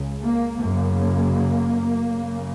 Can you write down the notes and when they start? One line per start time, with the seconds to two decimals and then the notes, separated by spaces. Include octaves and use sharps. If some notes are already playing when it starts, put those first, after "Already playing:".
Already playing: C#2 C#3
0.23 A#3
0.61 F#2 C#3 A#3
2.08 F#2 C#3